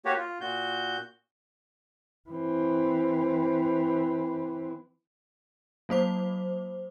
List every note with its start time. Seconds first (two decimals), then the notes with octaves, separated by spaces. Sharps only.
0.05 A#3 F#4 G4 C#5
0.17 F4
0.41 A#2 F#4 G6
2.29 E3 C4
5.89 F#3 A#3 C5 D6